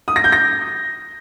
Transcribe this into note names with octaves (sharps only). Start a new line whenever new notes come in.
D#6
A#6
G6
A#6